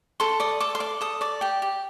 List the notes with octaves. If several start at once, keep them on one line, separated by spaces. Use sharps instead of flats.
A4 C6
D5 D#6
A4 D6
C6
D5 D6
A4 D#6
D5 D6
G4 G5
G4